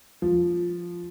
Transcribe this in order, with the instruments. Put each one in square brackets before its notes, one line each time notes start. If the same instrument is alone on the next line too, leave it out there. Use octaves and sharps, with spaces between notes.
[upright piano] F3